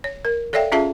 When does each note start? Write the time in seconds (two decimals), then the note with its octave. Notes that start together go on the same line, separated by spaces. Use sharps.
0.04 C#5
0.25 A#4
0.53 A4 C#5 D5 E5 F5 G5
0.72 C#4 F4 G#4 E5 F5 A5